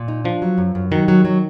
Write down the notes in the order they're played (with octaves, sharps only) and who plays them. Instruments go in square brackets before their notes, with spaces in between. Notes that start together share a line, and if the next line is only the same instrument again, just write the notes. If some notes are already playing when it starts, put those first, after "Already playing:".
Already playing: [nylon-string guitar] A#2
D#4
[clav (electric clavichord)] F3 [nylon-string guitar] D4
[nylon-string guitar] F#3
F#2
F#2
[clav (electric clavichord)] D#3 [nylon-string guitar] F#3
[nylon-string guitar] F#3
F#3